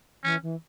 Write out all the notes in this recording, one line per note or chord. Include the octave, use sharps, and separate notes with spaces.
E3 C#4
E3